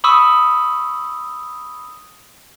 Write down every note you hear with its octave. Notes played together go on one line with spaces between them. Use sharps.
B5 C#6 D#6 E6